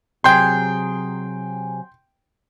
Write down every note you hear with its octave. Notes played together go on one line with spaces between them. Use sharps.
C3 F#3 G#4 G5 C6